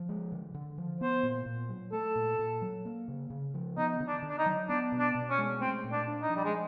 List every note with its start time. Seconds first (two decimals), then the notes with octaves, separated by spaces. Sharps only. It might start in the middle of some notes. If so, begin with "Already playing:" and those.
Already playing: F3
0.09 G#3
0.32 D3
0.54 D3
0.78 F3
1.00 B3 C5
1.23 A#2
1.46 A#2
1.69 F#3
1.92 A3 A4
2.15 A#2
2.39 A#2
2.62 F#3
2.85 A#3
3.08 C#3
3.30 C#3
3.54 F3
3.77 B3 D#4
4.00 D3
4.07 D4
4.22 D3
4.29 D4
4.38 D#4
4.46 F#3
4.69 B3 D4
4.92 B2
4.99 D4
5.15 B2
5.30 C#4
5.38 G#3
5.61 A3 C4
5.84 A#2
5.92 D4
6.08 D4
6.22 D#4
6.29 F3
6.36 G3
6.45 G#3